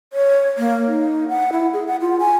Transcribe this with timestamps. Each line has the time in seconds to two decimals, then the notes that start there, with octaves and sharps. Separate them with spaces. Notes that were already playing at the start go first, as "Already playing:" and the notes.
0.13 C#5
0.58 A#3
0.87 D#4
1.29 F#5
1.52 E4
1.73 G#4
1.87 F#5
2.01 F4
2.20 G#5